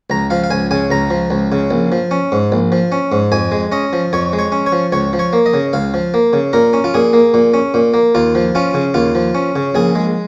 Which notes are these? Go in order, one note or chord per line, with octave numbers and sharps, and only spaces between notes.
C#2 A#5
F3 F5
F5
C#2 G#5
C#3 G#5
C#2 A#5
F3
C#2
C#3
A#1
F3
C#4
G#2
A#1
F3
C#4
G#2
F2 G#5
G#3
C#4 D#5
F3
F2 C#5
G#3
C#5
C#4
C#5
F3
C#2 C#5
F3
C#5
A#3
D#5
C#3
C#2 F5
F3
A#3
C#3
A#2 A#4
C#4
F4
A#2 G#4
A#3
A#2
C#4
A#2
A#3
D#2 F4
F3
C#4 F4
C#3
D#2 F4
F3
C#4
C#3
A#1 G#4
G#3